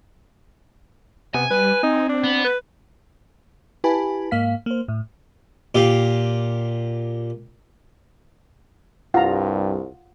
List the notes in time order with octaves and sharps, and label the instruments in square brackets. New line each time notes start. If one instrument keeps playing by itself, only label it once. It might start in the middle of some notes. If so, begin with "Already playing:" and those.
[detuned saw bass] C3 [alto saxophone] B3 [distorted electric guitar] G#5
[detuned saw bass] G3 [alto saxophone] B4
[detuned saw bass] C4 [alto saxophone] D#4
[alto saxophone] D4
[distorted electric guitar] B3
[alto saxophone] B4
[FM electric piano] E4 G4 B4 G#5 A5 B5
G#2 A#3 F5 B6
A#3 C5
A2
[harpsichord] A#2 G4 F5
[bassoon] C2 [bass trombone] G2 [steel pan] F4 A#5 [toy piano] F#5